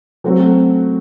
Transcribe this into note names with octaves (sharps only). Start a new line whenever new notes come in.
F#3 A3 C4 F#4